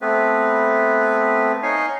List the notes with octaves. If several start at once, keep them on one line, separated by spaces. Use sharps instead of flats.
A3 B3 C4 B4
D#4 C#5 F5 G#5